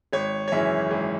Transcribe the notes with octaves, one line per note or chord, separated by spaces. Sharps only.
G#1 C#5
C#5
F#2 C#3 E3 E5
G#1